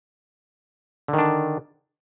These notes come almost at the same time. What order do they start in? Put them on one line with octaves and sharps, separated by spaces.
D3 D#3 D4